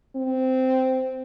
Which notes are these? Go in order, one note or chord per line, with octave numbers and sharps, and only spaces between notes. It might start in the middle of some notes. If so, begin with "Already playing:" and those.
C4